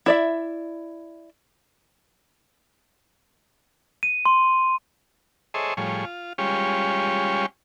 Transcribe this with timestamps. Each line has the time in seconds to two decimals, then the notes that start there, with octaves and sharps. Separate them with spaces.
0.06 E4 D5 E5
4.03 D#7
4.25 C6
5.54 G#4 A4 C5 C#5 D#5 E5
5.77 A2 F3 G3 G#4 C#5
6.05 F4
6.38 G3 G#3 C#4 F4 G4 C#5